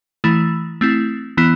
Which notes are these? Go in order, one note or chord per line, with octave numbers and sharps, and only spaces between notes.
E3 A3 E4
A3 C4 E4
E3 B3 E4